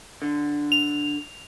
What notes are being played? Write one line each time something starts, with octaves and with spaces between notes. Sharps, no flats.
D3
F7